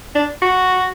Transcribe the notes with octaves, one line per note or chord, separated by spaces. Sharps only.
D4
F#4